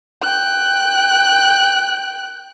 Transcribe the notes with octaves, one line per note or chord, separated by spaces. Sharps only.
G5 F#6